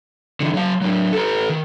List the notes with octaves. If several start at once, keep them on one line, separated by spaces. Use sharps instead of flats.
D3 E3
F#3 F5
F#3 D4
A4 B4
D#3